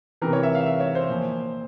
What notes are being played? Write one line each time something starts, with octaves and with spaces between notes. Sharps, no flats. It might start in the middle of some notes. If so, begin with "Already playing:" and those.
C3 E3 A#4
C#5
E5
F5
E5
C#5
C5
A#2 F3